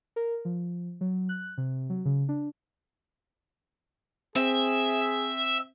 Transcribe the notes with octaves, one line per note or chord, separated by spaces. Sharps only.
A#4
F3
F#3
F#6
C3
F#3
C#3
D4
C4 G#4 E5